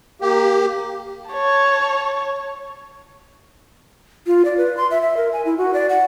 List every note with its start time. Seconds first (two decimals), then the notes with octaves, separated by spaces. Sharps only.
0.21 A#3 G4
1.29 C#5 A5
4.27 F4
4.45 D5
4.57 B4
4.77 C6
4.91 E5
5.02 E5
5.17 A#4
5.33 G#5
5.45 E4
5.58 F#4
5.74 D5
5.89 F#5